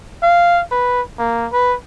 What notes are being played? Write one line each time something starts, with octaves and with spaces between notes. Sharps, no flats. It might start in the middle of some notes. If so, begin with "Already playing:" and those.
F5
B4
A#3
B4